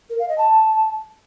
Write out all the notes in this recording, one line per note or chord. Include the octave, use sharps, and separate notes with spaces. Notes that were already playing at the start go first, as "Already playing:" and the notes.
A#4
F5
D#5
A5